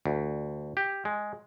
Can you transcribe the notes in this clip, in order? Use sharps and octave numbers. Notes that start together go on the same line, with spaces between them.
D2
G4
G#3